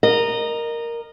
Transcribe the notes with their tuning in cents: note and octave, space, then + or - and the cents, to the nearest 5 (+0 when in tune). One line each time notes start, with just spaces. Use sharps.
A#4 +0 D#5 -20